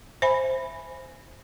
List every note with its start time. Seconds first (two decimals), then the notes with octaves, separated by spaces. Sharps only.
0.22 C5 E5 G#5 B5